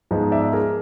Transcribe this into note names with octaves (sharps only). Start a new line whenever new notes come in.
G#2 F3 G#3 B3
D5 E5
G#4 A#4